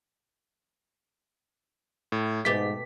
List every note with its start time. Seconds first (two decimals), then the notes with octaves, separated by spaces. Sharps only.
2.12 A2
2.45 G#2 B2 A3 G4 B6